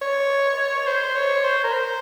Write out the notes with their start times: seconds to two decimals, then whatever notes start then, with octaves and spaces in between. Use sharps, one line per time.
0.02 C#5
0.87 C5
1.16 C#5
1.44 C5
1.64 A#4
1.73 C5